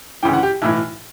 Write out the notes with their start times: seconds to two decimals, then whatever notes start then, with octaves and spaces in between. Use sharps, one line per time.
0.23 D2 C#3 E3 G5
0.33 F#5
0.43 G4
0.62 B1 A2 E3 E4